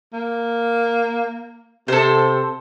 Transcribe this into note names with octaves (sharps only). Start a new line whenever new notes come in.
A#3
C3 A4 C5